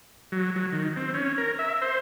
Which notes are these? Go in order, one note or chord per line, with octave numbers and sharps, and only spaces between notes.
F#3
F#3
D#3
C4
C#4
A#4
E5
C5